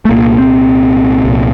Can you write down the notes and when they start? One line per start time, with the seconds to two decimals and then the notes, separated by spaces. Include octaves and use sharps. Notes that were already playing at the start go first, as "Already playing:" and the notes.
0.05 A3
0.09 C2 A#2 A#3
0.38 C4
1.24 C2 A#2